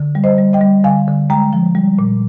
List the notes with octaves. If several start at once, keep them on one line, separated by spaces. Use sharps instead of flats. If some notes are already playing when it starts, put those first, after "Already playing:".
Already playing: D3
G3
C5 D#5
G3
D#5 G5
G3
D3 F5 G#5
D3
G#3 G5 A#5
F3
G3
A#2